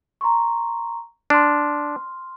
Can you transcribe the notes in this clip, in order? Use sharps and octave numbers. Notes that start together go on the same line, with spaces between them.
A#5 C6 C#6
D4 C6 F6